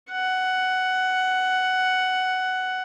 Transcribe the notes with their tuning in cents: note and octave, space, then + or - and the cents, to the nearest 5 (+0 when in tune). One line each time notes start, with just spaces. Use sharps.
F#5 +10